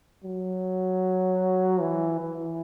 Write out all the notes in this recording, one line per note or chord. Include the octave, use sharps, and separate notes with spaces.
F#3
E3
E3